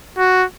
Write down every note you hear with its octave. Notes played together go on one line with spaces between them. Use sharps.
F#4